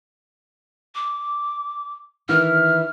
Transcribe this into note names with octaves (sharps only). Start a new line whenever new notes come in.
D6
D#3 E3 E4 F6